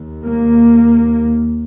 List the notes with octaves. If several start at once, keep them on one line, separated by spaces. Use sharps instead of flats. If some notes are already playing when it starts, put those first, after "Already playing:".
Already playing: D#2
A#3